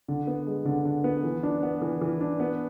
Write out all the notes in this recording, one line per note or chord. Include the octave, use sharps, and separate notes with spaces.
D3
B3
G#3
D3
D3
B3
E3
D4
B3
E3
E3
D4
B3